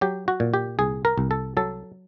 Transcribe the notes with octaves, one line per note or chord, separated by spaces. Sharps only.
F#3 G4
F#4
A#2
G4
C2 G#4
A#4
C2
A4
F#3 A4